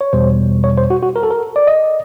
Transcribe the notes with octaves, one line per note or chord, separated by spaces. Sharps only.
C#5
E2 B2 G3 C5
C#5
C5
F#4
F#4
A#4
A4
A#4
D5
D#5